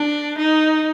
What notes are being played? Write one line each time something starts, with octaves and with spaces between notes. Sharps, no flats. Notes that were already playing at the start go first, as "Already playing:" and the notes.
Already playing: D4
D#4